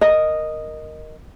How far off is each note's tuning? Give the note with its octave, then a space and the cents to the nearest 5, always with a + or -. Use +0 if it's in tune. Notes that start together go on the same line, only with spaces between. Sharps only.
A#4 +0 D#5 -5